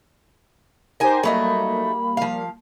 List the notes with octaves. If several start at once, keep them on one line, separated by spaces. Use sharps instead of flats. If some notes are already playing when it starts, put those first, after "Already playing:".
D#4 G4 A#4 C5 G#5
F#3 G3 A3 A#3 D#4 B5
F3 F5